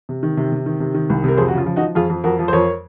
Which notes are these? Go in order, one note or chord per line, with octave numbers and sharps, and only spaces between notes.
C3
D#3
C3
C3
D#3
C3
D#3
C2
C3 A#4
F2 G#4 C5
F#4
C#3 F4
F3
D#4 F#4
F3
F2 F4 G#4
F2
F2 F#4 A#4
F3
C5
F2 A#4 C#5